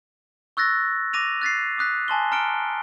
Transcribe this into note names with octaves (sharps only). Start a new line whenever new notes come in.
C#6 E6 F#6 A6 A#6
D6 A#6 D#7 F7
F#6 A6 B6 C7
D6 D#6 F#6 B6
G#5 A5 C6 G7
A#5 F6 C#7 D7 G7